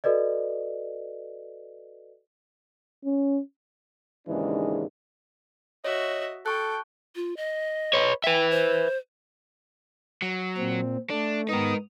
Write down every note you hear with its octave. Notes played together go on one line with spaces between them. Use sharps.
F#4 A4 B4 D5 D#5
C#4
D#2 G#2 C#3 E3 G#3 D4
F#4 C#5 D#5 E5
A4 G5 A5 C#6 F#6
F4
D#5
B4 C#5
B4 E5 G5
C5
F#3
A#2 C4
A3 D4
G#2 B3 D#4 A#4 D#6